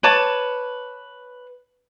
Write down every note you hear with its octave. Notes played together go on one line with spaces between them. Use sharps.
B4 C#5 A5 D6